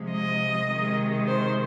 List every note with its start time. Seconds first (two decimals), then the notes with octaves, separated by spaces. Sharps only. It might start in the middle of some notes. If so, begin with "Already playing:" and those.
Already playing: C3 F3 G#3
0.11 D#5
0.68 C3 D#3 G#3
1.26 C5